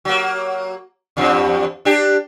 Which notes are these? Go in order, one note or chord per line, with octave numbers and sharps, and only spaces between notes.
F#3 A#3
E2 G2 F3
D4 G4